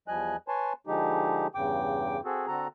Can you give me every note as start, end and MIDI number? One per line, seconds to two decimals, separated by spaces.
0.08 0.36 40
0.08 0.36 53
0.08 0.36 55
0.08 0.36 75
0.08 0.36 80
0.08 0.36 90
0.48 0.73 71
0.48 0.73 73
0.48 0.73 80
0.48 0.73 81
0.48 0.73 84
0.87 1.47 50
0.87 1.47 53
0.87 1.47 56
0.87 1.47 63
0.87 1.47 67
1.55 2.21 40
1.55 2.21 43
1.55 2.21 49
1.55 2.21 79
1.55 2.21 86
2.25 2.47 60
2.25 2.47 66
2.25 2.47 68
2.25 2.47 69
2.48 2.68 50
2.48 2.68 60
2.48 2.68 66
2.48 2.68 69
2.48 2.68 82